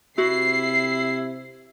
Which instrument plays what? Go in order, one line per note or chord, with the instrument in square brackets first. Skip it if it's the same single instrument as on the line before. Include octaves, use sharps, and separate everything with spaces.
[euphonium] C3 [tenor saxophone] E4 [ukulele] F#4 [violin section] C7